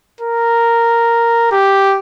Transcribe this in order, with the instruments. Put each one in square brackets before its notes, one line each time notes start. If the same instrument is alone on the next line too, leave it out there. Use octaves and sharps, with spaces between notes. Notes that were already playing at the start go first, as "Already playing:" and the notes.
[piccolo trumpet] A#4
G4